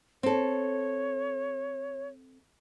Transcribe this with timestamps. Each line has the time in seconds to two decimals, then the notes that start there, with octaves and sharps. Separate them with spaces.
0.23 C4 A4 C#5